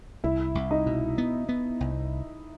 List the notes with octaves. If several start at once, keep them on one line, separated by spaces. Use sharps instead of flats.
C2 E4
C2
D#4
B2
B3
B3
C2